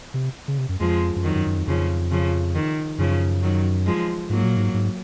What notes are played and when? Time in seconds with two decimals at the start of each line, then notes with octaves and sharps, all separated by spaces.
0.14 C3
0.48 C#3
0.58 C3
0.69 F#2
0.80 F2 F3 G#3
1.16 F#2
1.24 F2 D#3 F#3
1.35 F#2
1.46 F#2
1.57 F2
1.67 F2 C#3 F3
2.11 C#3 F3
2.55 D#3
2.98 F#2 C#3 F3
3.42 D#3 F#3
3.86 F3 G#3
4.30 G#2 F#3 A#3
4.44 A#2
4.57 G#2
4.74 G#2